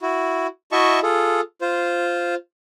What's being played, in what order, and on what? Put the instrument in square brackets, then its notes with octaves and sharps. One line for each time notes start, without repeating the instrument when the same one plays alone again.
[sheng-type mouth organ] E4 F#4
E4 F#4 D#5 E5 A5 C#6
F4 G#4 A4
F4 C5